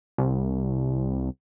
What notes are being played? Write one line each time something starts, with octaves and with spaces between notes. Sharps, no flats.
C2